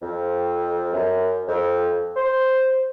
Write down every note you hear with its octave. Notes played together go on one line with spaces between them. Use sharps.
F2
F#2
F2
C5